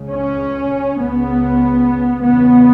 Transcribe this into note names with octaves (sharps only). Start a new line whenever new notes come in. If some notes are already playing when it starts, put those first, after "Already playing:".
Already playing: C#2 C#3
C#4
C#2 C#3 B3
E2 C#3 B3